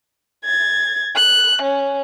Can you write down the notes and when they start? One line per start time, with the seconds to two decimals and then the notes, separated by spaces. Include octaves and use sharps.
0.44 G#6 A6
1.16 F#6
1.62 C#4